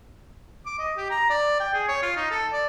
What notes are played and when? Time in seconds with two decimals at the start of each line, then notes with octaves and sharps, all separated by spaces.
0.66 D6
0.79 D#5
0.97 G4
1.11 A#5
1.30 D5
1.60 G5
1.74 G#4
1.88 C#5
2.03 F4
2.17 D#4
2.31 A4
2.53 D5